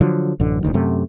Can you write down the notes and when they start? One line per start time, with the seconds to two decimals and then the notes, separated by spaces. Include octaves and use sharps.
0.01 D3 F3 F#3
0.40 A1 F#2 D3
0.63 F1 D2 D#3
0.74 F#2 C3 A3